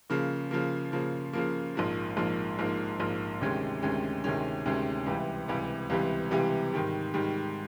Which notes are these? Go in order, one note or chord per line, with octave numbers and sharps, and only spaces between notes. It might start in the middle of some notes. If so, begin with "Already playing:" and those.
C#3 F3 A#3
C#3 F3 A#3
C#3 F3 A#3
C#3 F3 A#3
A#1 G#2 F3 A#3
A#1 G#2 F3 A#3
A#1 G#2 F3 A#3
A#1 G#2 F3 A#3
D2 C3 D#3 G#3 C#4
D2 C3 D#3 G#3 C#4
D2 C3 D#3 G#3 C#4
D2 C3 D#3 G#3 C#4
C#2 C3 E3 G3
C#2 C3 E3 G3
C#2 C3 E3 G3
C#2 C3 E3 G3
G#2 D#3 G3
G#2 D#3 G3